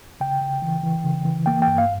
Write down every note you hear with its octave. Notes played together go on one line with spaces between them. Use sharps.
C#3 G5
C#3
E3
E3
C#3
E3
A#3 G5
G5
G2
F5